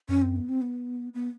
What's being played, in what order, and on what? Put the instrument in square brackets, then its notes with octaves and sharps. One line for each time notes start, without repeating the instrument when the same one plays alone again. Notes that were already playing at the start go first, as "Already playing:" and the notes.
[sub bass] F#2 [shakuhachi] C#4
[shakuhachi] C4
B3
C4
B3
B3